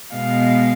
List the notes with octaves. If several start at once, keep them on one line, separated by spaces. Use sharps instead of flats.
B2 G#3 B3 F5